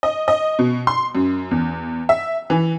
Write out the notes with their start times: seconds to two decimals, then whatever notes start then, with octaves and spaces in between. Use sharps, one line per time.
0.03 D#5
0.28 D#5
0.59 B2
0.87 C6
1.15 F#2
1.51 E2
2.09 E5
2.50 E3